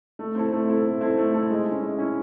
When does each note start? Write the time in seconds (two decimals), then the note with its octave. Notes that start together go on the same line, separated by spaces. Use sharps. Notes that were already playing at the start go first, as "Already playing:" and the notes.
0.19 A3
0.35 C4 E4 A4
0.52 A3
0.69 C4 E4 A4
0.85 A3
1.01 C4 E4 A4
1.17 A3
1.34 C4 E4 A4
1.50 G#3
1.66 C#4 E4
1.82 G#3
1.98 C#4 E4